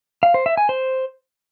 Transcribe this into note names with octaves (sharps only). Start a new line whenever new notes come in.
F5
C5
E5
G#5
C5